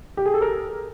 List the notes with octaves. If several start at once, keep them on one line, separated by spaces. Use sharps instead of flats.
G4
G#4
A4
A#4